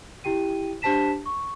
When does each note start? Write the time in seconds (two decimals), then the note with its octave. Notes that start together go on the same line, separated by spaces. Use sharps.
0.24 E4 G4 G5 D#7
0.82 D4 G4 C5 A5 B6 E7
1.26 C#6